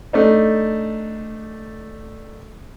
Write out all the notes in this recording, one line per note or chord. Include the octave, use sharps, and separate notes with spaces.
A3 D4 D#4